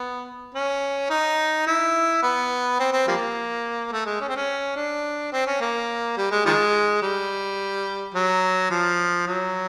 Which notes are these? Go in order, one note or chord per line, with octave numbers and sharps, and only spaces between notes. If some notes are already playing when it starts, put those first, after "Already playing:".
Already playing: B3
C#4
D#4
E4
B3
C4
C4
F3 G3 A#3
A3
G#3
C#4
C4
C#4
D4
C4
C#4
A#3
G3
G#3
D#3 F3 G#3
G3
F#3
F3
F#3